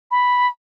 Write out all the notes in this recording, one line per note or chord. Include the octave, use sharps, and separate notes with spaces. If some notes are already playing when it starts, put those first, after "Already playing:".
B5